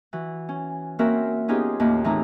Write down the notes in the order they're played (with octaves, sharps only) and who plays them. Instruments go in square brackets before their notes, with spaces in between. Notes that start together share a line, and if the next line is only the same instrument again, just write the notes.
[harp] E3 F#4
C#4
A#3 C4 C#4 F#4 A#4 E5
B3 C#4 D#4 F4 G4 G#4
D#2 A2 A#3
A2 E3 A3 C4 D#4 A#5